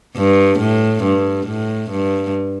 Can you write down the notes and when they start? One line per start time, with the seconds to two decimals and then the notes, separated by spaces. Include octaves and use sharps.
0.16 G2
0.59 A2
1.03 G2
1.47 A2
1.91 G2